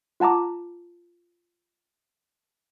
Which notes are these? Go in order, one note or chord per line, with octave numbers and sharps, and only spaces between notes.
F4 F#5 A5 A#5 D6